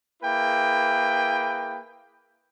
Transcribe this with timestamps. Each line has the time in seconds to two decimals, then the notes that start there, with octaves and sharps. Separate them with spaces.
0.22 A#3 E4 G#4 B4 G5